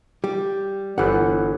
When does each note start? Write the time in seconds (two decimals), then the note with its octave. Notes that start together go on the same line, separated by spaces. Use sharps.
0.24 G3 G4
0.98 G1 E3 B3 C5 F#5